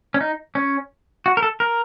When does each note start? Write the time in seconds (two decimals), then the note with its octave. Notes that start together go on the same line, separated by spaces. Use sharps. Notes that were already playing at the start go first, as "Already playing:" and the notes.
0.14 C#4
0.21 D#4
0.55 C#4
1.26 F#4
1.37 A#4
1.42 A4
1.60 A#4